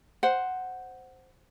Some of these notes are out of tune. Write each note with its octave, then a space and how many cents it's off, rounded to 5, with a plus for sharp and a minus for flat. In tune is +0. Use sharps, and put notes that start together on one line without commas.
C5 +0 F#5 +0